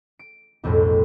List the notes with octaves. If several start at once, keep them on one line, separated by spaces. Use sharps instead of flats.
D7
B1 F2 A2 G3 G#3